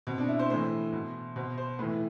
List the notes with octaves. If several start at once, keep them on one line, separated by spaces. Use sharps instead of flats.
B2 C4
D4
E4
C5
A2 E3 C5
B2
B2 C5
C5
A2 E3 B4